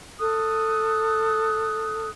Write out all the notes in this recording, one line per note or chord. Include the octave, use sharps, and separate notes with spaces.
A4 D#6 F#6